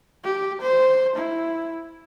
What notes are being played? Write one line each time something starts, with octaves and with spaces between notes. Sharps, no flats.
G4
C5
E4